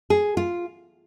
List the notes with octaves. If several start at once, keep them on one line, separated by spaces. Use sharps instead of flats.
G#4
F4